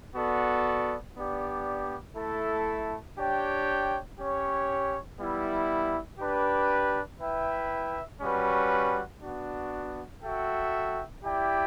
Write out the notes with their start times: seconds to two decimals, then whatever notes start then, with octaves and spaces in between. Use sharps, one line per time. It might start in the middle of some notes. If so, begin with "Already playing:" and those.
0.16 B3 F#4 A4 D5
1.16 B3 D4 G4 D5
2.16 A3 E4 A4
3.18 D4 G4 C#5 G5
4.18 C#4 G4 C#5
5.19 G3 B3 E4
6.19 D4 G4 B4
7.20 E4 B4 E5 G5
8.21 G3 C#4 F#4 B4
9.22 B3 D4 F#4
10.22 F#4 A4 E5 G5
11.23 E4 G4 D5 G5